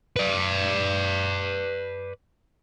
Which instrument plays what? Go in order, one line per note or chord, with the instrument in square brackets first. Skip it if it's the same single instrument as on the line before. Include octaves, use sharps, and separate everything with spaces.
[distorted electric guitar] B4 D5